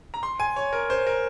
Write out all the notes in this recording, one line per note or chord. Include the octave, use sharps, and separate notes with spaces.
A#5
C6
G#5
C#5
A#4
C5
A#4